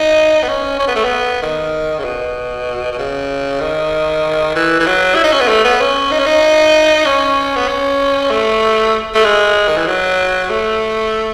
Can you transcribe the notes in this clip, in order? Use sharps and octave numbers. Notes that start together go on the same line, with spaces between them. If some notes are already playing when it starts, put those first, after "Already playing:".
Already playing: D#4
B3
C#4
C#4
B3
A3
B3
D#3
C#3
B2
B2
C#3
D#3
E3
E3
F#3
E4
D#4
C#4
B3
A3
B3
C#4
D#4
C#4
D#4
C#4
B3
C#4
A3
A3
G#3
D#3
E3
F#3
A3